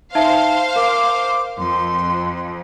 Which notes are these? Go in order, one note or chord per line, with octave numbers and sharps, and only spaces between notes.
D#4 C5 E5 F5 A5
A#4 D6
F2 C6